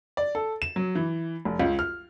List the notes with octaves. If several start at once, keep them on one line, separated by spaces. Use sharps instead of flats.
D5
A4
E7
F#3
E3
F1
C#2
F6